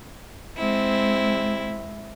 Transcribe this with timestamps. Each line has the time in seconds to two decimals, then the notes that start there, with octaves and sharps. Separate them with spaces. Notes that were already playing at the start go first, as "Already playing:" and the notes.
0.57 G#3 C4 E4